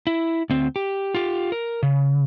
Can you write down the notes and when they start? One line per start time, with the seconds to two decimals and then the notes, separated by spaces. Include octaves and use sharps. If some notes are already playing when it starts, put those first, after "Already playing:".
0.07 E4
0.50 D2 C4
0.76 G4
1.15 F4 G4
1.52 A#4
1.83 C#3